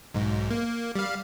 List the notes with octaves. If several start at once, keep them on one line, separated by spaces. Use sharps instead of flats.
B1 G#2
A#3
G3 F5